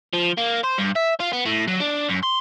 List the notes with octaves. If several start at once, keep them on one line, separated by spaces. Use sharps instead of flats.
F3
A#3
C5
G2
E5
F4
B3
A2
F#3
D4
F#2
C6